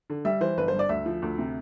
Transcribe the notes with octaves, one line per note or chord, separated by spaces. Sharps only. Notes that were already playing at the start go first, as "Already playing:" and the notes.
D3
G3 E5
E3 C5
G1 B4
C5
G2
D5
D2 E5
F3
D2
C3